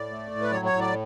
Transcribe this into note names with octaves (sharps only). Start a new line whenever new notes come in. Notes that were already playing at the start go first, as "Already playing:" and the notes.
Already playing: A2 D5
A3
A2
B4
F#3 C#5
C#5
A2
D5